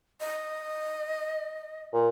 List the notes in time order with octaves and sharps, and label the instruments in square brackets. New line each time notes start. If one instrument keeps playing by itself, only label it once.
[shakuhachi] D#5
[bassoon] A#2